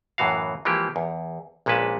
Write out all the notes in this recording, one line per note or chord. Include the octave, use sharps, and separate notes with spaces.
F#2 A2 E3 F#4 F5
E3 F3 G#3 A#3 G4
E2
A#1 A#2 G#3 C#4 B4 A5